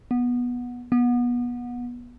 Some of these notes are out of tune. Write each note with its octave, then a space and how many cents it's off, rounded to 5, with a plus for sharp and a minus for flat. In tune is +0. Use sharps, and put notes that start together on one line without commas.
B3 -15
B3 -25